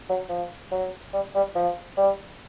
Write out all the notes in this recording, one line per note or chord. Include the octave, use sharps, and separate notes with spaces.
F#3
F3
F#3
G3
G3
F3
G3